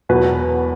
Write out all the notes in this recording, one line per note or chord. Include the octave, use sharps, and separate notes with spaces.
E1 E2 B2 F#3 B4